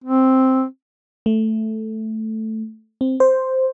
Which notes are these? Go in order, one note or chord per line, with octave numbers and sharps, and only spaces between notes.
C4
A3
C4
C5